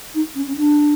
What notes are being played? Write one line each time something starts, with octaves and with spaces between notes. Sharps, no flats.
D#4
C#4
C#4
D4